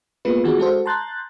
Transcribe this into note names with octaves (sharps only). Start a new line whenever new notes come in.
G#3 A#3 B3 F4 B4
D#3 E3 B3 F4 F#4 G#4
G#3 F#4 A4 C5
A5 A#5 C6 F#6 G6 A6